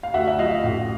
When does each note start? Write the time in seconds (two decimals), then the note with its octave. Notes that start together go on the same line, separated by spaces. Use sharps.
0.03 F5
0.14 D2 E5 F#5
0.27 E5
0.39 F3 D#5 F5
0.64 A1